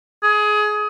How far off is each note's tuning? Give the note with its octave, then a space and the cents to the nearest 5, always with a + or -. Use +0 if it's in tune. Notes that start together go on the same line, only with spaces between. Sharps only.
G#4 +20